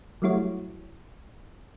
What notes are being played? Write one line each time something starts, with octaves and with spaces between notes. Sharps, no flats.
F#3 G3 A3 E4 F#4 C#5